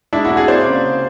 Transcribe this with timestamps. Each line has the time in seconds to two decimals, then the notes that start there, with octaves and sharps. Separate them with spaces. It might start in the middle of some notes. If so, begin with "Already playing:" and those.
0.13 G#3 D4 E4
0.25 E4 F#4
0.30 C3
0.36 F#4 G#4
0.48 A#3 C5 D5
0.67 C#3